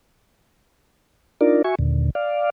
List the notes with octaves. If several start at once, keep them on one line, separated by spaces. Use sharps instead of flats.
D4 D#4 F4 A#4 D5
F#4 E5 G#5 C#6
D#2 A#2 D3
D5 F5